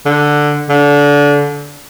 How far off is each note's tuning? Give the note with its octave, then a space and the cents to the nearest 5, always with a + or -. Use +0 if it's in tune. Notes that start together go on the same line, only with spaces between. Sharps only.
D3 +5
D3 -25